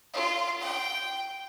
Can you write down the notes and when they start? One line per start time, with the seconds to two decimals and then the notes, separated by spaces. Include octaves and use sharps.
0.14 F4
0.60 G5